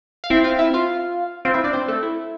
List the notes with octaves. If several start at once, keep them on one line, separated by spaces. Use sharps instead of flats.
F5
C4 E4 E5
F4 F5
E4 E5
F4 F5
C4 F4 F5
E4 E5
D4 D5
C4 C5
A3 A4
E4